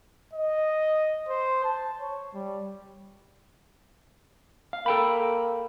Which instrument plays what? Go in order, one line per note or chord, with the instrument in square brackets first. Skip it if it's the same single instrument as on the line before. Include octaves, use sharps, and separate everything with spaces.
[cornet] D#5
C5
A5
C#5
G3
[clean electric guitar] F5
[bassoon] A#3 [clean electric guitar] A4 G5 B5